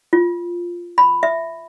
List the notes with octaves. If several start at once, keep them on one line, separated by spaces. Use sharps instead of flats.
F4
B5
E5